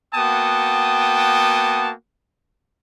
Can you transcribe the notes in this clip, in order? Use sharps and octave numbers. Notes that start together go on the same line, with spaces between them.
A#3 B3 F#4 G5 A5 D#6